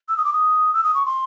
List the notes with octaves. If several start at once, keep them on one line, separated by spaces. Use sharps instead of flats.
E6
D#6
D6
D#6
E6
D#6
C#6
C6